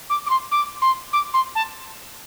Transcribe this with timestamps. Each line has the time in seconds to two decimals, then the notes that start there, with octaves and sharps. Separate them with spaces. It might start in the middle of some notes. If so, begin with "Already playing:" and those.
0.10 D6
0.26 D6
0.30 C6
0.51 D6
0.82 C6
1.13 D6
1.34 C6
1.55 A5